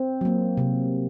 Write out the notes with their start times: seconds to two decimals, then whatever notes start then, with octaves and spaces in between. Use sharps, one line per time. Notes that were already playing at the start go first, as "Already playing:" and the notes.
Already playing: C4
0.21 F#3 A#3
0.57 C3